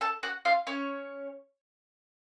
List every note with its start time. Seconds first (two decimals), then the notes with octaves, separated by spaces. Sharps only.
0.01 A4 A5
0.23 F#4 F#5
0.45 F4 F5
0.67 C#4 C#5